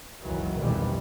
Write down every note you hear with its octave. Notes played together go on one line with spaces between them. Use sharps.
F#1 C#2 D#3 E3 F#3
A#1 F2 B2 D#3 E3 G3